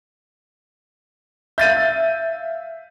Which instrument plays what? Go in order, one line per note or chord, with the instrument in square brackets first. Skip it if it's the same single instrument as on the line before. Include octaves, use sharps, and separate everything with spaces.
[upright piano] E5 F5 [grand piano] G6 A6 D#7